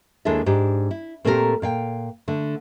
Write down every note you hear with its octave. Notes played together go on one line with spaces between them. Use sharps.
D#2 G#3 D4 E4 A4 E5
G#2 D4 G4
E4
A#2 A3 C4 E4 G4 A#4
A#2 F5 G5
D3 A3